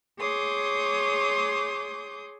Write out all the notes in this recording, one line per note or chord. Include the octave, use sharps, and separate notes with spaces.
G#4 C#5 C6 D6 D#6 G6